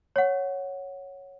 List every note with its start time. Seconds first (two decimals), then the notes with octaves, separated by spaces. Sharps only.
0.16 C#5 F#5